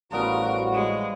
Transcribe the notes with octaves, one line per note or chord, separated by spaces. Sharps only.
A1 F3 G3 B3 F#4 A#4
G#3